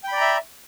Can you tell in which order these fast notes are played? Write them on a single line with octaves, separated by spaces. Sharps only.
G5 B5 D5 A#5 E5